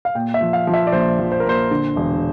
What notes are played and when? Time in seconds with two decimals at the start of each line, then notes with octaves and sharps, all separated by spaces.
0.05 F5
0.15 A#2 G5
0.34 E5
0.41 F3
0.53 F5
0.67 F3
0.74 E5
0.87 D5
0.92 A#1 C5
1.19 F3
1.32 C5
1.40 A#4
1.45 A#2 C5
1.71 D3
1.96 E1